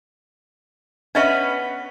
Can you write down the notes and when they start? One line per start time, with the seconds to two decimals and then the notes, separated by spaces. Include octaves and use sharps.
1.15 B3 C#4 D4 B4 D#5 E5